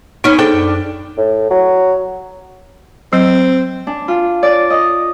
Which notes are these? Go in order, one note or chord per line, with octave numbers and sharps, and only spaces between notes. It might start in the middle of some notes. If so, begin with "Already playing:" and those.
B3 C#4 D#4
D4 G#4 A4 C5 G5
F#2
A2
F#3
F#3 C4
D4
F4
D5
D#5